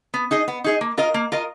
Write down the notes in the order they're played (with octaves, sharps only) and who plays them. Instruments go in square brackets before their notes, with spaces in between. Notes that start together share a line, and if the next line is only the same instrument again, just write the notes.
[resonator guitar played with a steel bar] B3
D#4 G#4 D#5
B3
D#4 G#4 D#5
A#3
F4 A#4 D#5
A#3
F4 A#4 D#5